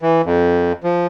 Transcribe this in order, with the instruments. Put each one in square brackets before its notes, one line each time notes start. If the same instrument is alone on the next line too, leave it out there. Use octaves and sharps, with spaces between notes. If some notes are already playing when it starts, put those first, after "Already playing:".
[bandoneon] E3
F2
F3